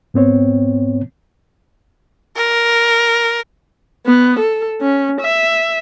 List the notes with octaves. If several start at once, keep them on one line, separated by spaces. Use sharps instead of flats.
G#2 B3 C4 C#5
A#4
B3
A4
C#4
E5